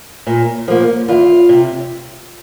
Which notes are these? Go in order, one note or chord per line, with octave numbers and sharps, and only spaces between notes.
A#2
F3 A#3
E2 F4
C3